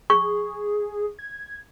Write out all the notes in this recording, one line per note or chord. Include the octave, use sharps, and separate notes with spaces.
G#4 C#6
G#6